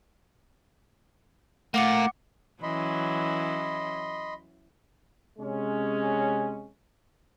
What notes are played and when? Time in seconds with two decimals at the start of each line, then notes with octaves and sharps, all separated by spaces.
1.74 A3 A#3 F4 F#5 D6 C#7
2.63 E3 F#3 C#4 D#5 B5 C6
5.39 C3 G#3 C#4